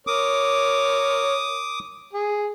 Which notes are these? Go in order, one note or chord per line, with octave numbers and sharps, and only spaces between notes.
A#4 C#5 D6 D#6
G#4